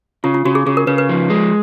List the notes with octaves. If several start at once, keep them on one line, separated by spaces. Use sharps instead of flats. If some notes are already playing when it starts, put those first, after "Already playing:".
C#3 F4
F4
C#3 F#4
G#4
C#3 G#4
A#4
C#3 B4
B4
F3
G#3